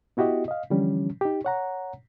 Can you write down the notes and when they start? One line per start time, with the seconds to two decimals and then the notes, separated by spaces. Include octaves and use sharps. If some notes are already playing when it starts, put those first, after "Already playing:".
0.17 B3 E4 F#4 G4 D#5
0.48 D#5 F5
0.70 D3 E3 F3 G3 C#4
1.21 D#4 G4
1.45 C#5 F#5 A#5